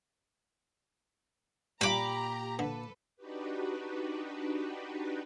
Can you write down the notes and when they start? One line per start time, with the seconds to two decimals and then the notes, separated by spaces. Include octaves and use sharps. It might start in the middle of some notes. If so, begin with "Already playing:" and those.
1.81 A#2 G3 F4 G4 A#5 B5 D6
2.59 D3 A4 B4
3.16 D4 D#4 F#4 G4 B4